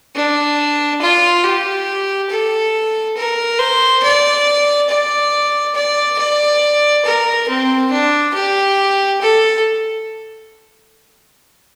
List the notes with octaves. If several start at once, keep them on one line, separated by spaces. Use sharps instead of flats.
D4
F4
G4
A4
A#4
C5
D5
D5
D5
D5
A#4
C4
D4
G4
A4